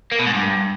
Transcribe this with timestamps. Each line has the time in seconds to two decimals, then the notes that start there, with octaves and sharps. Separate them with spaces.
0.12 A#3
0.19 B2
0.27 G#2
0.34 G2